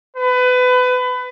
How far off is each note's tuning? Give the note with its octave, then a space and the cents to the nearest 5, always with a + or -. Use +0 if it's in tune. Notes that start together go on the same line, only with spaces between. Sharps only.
B4 +25